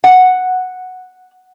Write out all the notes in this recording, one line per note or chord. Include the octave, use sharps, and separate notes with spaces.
F#5